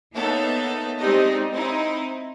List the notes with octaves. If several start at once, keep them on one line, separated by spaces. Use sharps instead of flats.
A#3 B3 D#4 A4 C#5 E5
G#3 C4 D#4 G4 D5 D#5
C4 D#4 E4